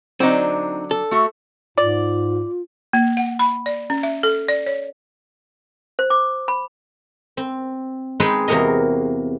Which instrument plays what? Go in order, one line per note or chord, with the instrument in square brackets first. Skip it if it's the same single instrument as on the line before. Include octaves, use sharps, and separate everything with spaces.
[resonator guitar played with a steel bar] D3 F#3 D4 [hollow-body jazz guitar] C4 D#4
[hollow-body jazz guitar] A4
[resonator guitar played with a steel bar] A3 F#4 E5
[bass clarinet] G#2 [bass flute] F4 [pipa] D5
[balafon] A#3
F#5
B5
D5
C#4
E5
A4
D5
C#5
[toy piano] C5
D6
B5
[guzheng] C4
G#3 C4 D#4 G#4 B4 G5
E2 C3 A#3 F#4 A#4 D#5